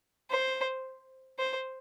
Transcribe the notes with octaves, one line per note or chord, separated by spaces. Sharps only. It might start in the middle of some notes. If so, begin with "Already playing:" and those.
C5
C5